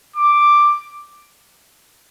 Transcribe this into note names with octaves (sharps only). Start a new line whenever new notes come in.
D6